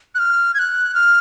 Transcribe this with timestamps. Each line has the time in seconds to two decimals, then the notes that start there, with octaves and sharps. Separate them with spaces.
0.15 F#6
0.19 F6
0.54 G#6
0.59 F#6
0.95 F6